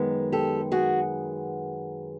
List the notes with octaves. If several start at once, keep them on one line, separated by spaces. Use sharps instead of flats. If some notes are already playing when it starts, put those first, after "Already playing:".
Already playing: F#2 D#3 G#3 B3
G4 A4
F#4 G#4